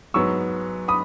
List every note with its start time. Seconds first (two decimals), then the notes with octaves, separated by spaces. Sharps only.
0.14 G#2 F#3 B3 C#6 E6
0.88 B5 D#6